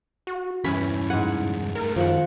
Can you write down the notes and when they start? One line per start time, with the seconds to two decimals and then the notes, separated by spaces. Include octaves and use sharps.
0.27 F#4
0.64 E2 G2 E3 C#4 B5
1.10 G#2 F#5 G#5
1.75 G#3 A3 A#4
1.96 F#2 D#3 F3 F#5